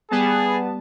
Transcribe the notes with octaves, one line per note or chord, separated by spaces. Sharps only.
G3 B3 G#4 A5